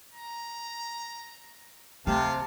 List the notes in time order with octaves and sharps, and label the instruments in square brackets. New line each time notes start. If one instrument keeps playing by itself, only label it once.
[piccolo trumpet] A#5
[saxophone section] C3 [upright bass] A3 [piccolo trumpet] F5 [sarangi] A5